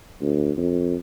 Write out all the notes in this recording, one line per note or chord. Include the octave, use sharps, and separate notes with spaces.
D2
F2